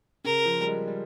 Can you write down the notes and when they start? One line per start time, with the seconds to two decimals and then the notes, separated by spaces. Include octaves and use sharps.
0.24 C#3 A#4
0.45 F3
0.61 G3
0.66 G#3
0.87 G3